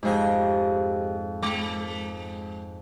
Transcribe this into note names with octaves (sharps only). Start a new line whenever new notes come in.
F2 G#2 G4 G#4 D#5
G#3 D6